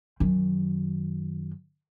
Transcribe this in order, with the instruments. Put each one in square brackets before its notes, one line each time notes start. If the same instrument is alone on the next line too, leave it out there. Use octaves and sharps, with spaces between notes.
[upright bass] F#2 D#3